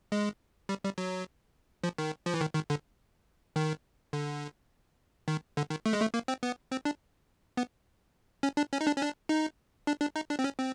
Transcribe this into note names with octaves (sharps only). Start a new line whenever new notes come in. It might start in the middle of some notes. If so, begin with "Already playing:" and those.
G#3
G3
G3
F#3
F3
D#3
F3
E3
D#3
D#3
D3
D#3
D3
D#3
D3
D#3
A3
G#3
A3
A#3
C4
B3
C4
D4
B3
C#4
D4
C#4
D#4
D4
C#4
D4
D#4
D4
D4
D#4
D4
C4
C#4
C4